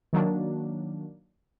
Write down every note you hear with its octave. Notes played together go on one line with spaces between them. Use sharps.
D#3 F#3 A#3 D4